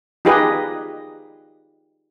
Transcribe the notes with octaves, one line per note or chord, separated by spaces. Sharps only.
D#4 F4 G4 G#4 B4 D#5